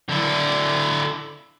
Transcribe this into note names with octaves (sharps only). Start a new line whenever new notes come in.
D3 E4